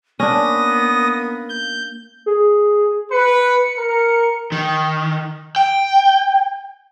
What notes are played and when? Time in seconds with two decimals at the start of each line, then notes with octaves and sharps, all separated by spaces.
0.20 A#3 B3 C#4 D4 D#6 A#6
1.50 G6
2.26 G#4
3.11 B4 C#7
3.77 A#4
4.52 D#3
5.56 G5